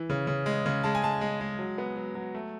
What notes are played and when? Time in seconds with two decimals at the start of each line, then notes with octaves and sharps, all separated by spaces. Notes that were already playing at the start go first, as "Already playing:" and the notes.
Already playing: E3
0.10 C#3
0.27 C#3
0.46 G#3
0.66 C#3
0.84 G#3 A5
0.95 G#5
1.03 G#3 A5
1.21 G#3
1.41 G#3
1.59 F#3
1.78 B3
1.96 F#3
2.15 F#3
2.34 A3